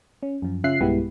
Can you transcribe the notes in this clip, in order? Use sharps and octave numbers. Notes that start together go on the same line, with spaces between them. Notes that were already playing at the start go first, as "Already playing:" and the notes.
C#4
F#2 F3
C#3 C#4 F4 E5 F#6 C7
B1 G2 G#3 B3 E4 G4